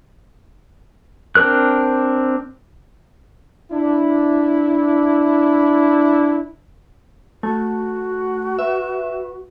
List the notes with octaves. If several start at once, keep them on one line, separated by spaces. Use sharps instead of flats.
C4 D4 A#4 F#6
D4 E4
A3 F#4
B4 E5